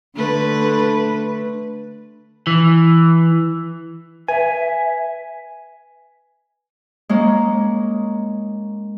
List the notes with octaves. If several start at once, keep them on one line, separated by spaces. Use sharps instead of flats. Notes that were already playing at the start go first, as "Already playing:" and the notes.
D3 A3 B4
E3
B4 E5 G#5
G#3 A#3 C#4